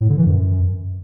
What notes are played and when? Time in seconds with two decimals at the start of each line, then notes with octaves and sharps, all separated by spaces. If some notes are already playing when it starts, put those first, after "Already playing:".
0.01 A2
0.09 D3
0.17 E3
0.26 F#2